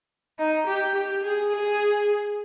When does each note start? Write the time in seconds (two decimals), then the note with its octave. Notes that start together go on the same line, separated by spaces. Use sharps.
0.39 D#4
0.67 G4
0.95 G4
1.24 G#4
1.51 G#4